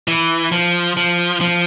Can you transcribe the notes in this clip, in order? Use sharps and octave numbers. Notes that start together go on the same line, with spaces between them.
E3
F3
F3
F3